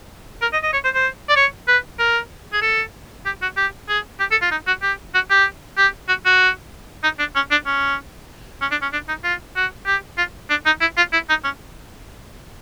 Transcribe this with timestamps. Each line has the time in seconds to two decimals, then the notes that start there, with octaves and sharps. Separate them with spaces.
0.42 A#4
0.53 D#5
0.63 D#5
0.73 C#5
0.84 C5
0.95 C5
1.29 D5
1.36 C#5
1.68 B4
1.99 A#4
2.53 G#4
2.62 A4
3.25 G4
3.42 F#4
3.57 G4
3.89 G#4
4.20 G4
4.31 A4
4.42 F4
4.51 D#4
4.67 F#4
4.82 G4
5.15 F#4
5.30 G4
5.77 G4
6.08 F#4
6.25 F#4
7.04 D#4
7.19 D4
7.35 C#4
7.51 D4
7.66 C#4
8.61 C#4
8.71 D4
8.82 C#4
8.93 D4
9.08 D#4
9.24 F4
9.56 F#4
9.86 G4
10.18 F4
10.50 D4
10.66 D#4
10.81 E4
10.97 F4
11.13 E4
11.29 D#4
11.44 C#4